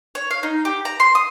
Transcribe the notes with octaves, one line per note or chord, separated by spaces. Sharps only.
C#5
F5
D#4
G4
A#5
C6
D#6